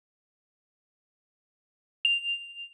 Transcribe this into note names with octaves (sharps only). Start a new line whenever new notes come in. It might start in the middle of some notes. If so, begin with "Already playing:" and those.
F7